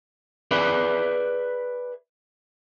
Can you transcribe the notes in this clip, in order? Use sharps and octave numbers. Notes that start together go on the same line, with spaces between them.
G#4 B4 D5 E5 B5